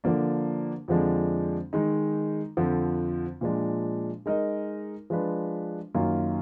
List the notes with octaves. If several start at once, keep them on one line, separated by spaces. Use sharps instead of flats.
D3 F3 A#3 D4
F2 D3 F3 G#3 D4
D#3 G#3 D#4
F2 D3 F3
A#2 F3 G#3 D4
G#3 D#4 A#4 D#5
F3 G#3 D4 F4 B4
F#2 D#3 A#3 F4